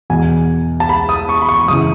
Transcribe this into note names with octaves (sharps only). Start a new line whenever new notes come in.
E2 B2 G#5
A5
B5
D#6
C#6
B5
C#6
F#2 C#3 E3 D#6